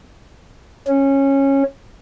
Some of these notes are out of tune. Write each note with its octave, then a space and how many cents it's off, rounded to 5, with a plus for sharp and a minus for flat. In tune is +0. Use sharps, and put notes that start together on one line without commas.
C#4 -15